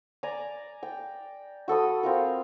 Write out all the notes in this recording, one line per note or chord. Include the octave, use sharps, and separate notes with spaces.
D5 G#5 A#5
G5
F#4 A4 B5 D#6
C4 F4 A#4